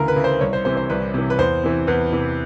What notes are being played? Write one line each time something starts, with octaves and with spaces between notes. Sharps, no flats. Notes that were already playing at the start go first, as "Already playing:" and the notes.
Already playing: D2 C#3 E3 A#4
B4
C#3 E3
C5
C2 C#5
C5
C3 E3 C5
C5
C2 B4
C3 E3
B4
E2 C5
C3 E3
E2 B4
C3 E3